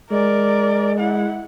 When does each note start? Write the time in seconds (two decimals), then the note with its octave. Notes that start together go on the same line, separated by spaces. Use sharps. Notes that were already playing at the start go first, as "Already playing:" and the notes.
0.10 G#3 A#4 D5
0.99 E4 F#5